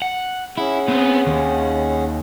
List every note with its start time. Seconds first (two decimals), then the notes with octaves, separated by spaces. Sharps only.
0.02 F#5
0.58 C#4 E4 G#4 F#5
0.88 B3 C4
1.27 D#2